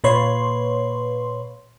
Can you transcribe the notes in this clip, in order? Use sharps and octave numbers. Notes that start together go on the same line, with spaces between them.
A#2 B4 C#5 C6